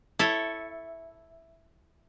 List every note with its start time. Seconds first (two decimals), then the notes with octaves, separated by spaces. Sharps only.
0.19 E4 A4 C#5 E5